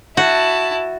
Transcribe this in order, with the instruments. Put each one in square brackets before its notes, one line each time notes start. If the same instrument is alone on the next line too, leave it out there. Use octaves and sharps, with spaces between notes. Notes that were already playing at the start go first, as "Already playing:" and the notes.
[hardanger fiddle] E4 A5 [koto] F#4